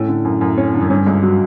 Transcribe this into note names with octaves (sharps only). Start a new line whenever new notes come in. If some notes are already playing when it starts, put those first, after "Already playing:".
Already playing: A2 C#4
D3
F#2
F#2
C#4
D3
F#2
G2 C#4
C#2
F#3